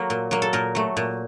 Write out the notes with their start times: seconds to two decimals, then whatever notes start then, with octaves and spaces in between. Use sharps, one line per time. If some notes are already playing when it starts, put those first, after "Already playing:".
Already playing: F#3 A#3 A4
0.10 A#2
0.31 F#3 A#3
0.42 A4
0.53 A#2 A#4
0.75 F#3 A3
0.97 A#2